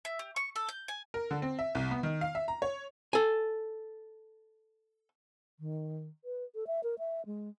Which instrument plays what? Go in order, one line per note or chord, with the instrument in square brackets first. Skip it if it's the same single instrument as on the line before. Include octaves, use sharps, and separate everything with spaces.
[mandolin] E5
G4
C#6
A4
G6
G#5
[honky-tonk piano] A#4
D3
C4
E5
C2
B3
D#3
F5
E5
A#5
C#5
[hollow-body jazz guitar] A4 G#5
[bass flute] D#3
B4
A4
E5
A#4
E5
G#3